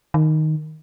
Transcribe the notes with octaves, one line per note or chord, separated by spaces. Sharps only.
D#3